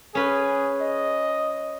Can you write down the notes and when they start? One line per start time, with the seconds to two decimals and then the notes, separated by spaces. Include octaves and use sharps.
0.15 C#4 G#4 B4
0.82 D#5